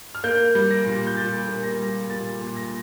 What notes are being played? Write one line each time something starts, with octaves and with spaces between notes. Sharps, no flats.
F6
A#3 G6
G3
A#6
A#2
G6
A#2 A6
A#3
A#6
G3
A#2 A6
A#2
A#6